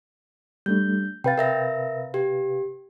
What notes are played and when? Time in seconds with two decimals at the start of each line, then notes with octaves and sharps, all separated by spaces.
0.66 G3 A3 D4 G6
1.24 C3 B4 F5 G5 A6
1.38 A#4 E5 A#6
2.14 G4